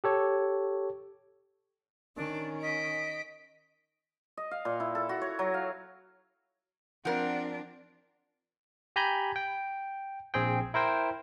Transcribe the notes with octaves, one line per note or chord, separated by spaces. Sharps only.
G4 A4 C#5
D#3 C#4 D4
D#5 B6 D7
D#5
F5
A#2
E4
A4
F#4
C#5
F#3
F5
F3 C4 D4 A#4 F#5
G4 G#5 A#5 B5 G6
G5
A#1 C4 G#4 G5
E4 A#4 C5 G5